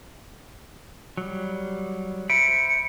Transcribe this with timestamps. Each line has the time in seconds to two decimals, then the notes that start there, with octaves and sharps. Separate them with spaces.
1.17 F#3 G3
2.30 C5 E5 B5 C#7 D7